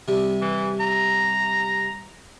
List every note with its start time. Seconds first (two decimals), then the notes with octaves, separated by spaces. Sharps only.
0.08 C3 G3
0.41 E3
0.80 A#5